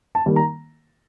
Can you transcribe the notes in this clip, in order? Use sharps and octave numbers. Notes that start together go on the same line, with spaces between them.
A5
D#3 G3 A#3
A#5